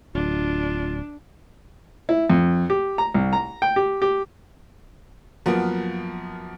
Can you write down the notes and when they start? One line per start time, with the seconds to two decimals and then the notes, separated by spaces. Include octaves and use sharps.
0.15 D1 D4 F4
2.09 E4
2.30 F2
2.70 G4
2.98 A#5
3.14 C2
3.33 A#5
3.62 G5
3.76 G4
4.02 G4
5.46 F#2 F3 A#3 B3